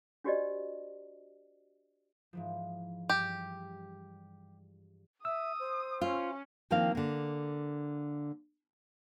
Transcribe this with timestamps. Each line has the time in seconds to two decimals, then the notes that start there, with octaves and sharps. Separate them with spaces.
0.24 D4 F#4 G4 C5 D5 D#5
2.33 G#2 E3 F3
3.09 G2 G4
5.25 E5 D#6 E6
5.59 C5
6.01 C#4 F4
6.71 D#3 F3 A#3 C4 E4 F5
6.95 D3 A#3